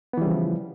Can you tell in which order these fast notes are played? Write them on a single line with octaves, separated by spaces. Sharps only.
B3 E3 G3 C#3 F3